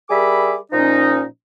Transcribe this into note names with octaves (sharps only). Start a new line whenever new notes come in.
G3 G#4 A#4 E5 B5 D6
A#2 F3 C#4 D#4